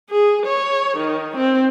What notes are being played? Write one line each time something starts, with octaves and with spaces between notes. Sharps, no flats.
G#4
C#5
D#3
C4